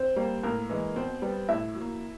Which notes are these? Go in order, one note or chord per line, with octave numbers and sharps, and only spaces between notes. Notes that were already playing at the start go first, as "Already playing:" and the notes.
Already playing: C4 C5
G3 A#3
A2 A#3 A#4
E3 G#3
B2 C4 C5
G3 B3
A2 E4 E5
F#3
A#3